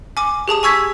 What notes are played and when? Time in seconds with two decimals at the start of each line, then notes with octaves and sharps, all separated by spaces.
0.17 G#5 D6
0.48 G4 G#4 A5 D#6
0.63 G#5 C#6 E6 G#6 B6